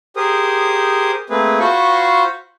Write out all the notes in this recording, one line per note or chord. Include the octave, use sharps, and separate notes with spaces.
G4 G#4 A#4 C5 D#6
A3 A#3 C4 G#4 B4
F4 F#4 C5 F5 B5 C#6